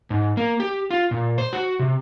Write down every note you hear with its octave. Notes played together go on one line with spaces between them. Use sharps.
G#2
A#3
G4
F4
A#2
C5
F#4
C3